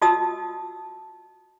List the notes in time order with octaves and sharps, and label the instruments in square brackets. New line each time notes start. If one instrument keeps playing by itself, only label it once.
[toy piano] F4 F#4 D#5 A5 D#6 E6